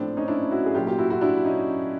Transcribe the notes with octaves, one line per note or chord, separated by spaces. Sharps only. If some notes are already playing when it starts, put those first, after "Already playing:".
Already playing: A2 F3 C4 D4
C#4 D#4
D4 E4
E4 F#4
G#4
A#2 F#3 F4 G4
F4 G4
E4 F#4
E4 F#4
D4 E4
C#4 D#4